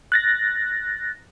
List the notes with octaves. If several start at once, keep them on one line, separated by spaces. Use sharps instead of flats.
F#6 A6 A#6